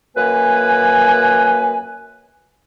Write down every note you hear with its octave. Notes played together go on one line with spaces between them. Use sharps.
F#2 A#3 B4 G#5